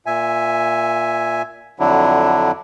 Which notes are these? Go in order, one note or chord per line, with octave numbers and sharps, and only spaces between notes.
A#2 E5 G#5
F2 D3 F#3 D4 E4